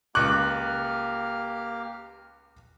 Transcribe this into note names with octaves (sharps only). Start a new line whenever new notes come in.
C#2 A#3 G4 C#6 D6 F6 F#6